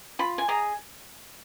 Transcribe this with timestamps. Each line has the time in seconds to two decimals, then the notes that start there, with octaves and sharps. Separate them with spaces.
0.19 F4 B5
0.38 G#5
0.48 G#4 D#5 A#5